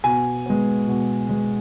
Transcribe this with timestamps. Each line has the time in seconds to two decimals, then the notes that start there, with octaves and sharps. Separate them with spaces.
0.04 B2 G#5
0.46 G#3 B3
0.87 B2
1.29 G#3 B3